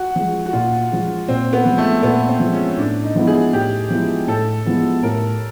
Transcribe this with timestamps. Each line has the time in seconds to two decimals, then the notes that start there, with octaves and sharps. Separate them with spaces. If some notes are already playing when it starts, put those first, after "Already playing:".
Already playing: F#4
0.16 F3 G#3
0.46 F#4
0.53 A#2 F4
0.91 F3 G#3
1.28 A#2 C4
1.53 B3
1.65 F3 G#3
1.78 A3
2.02 A#2 B3
2.28 C4
2.40 F3
2.45 G#3
2.53 C#4
2.78 A2 D4
3.03 D#4
3.15 F3 G#3 B3 E4
3.27 G#4
3.53 A2 G4
3.90 F3 G#3 B3 E4
4.27 A2 A4
4.65 F3 G#3 B3 E4
5.03 A2 A#4